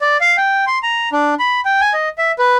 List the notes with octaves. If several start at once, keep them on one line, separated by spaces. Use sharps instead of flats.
D5
F5
G5
C6
A#5
D4
B5
G5
G#5
D#5
E5
B4